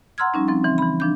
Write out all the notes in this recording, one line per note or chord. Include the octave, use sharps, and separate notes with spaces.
F#5 A#5 C6 E6 F6 G#6
F3 G3 C#4 D#4
F3 C4 A6
C#3 E3 C4
E3 B5
F3 D4 G6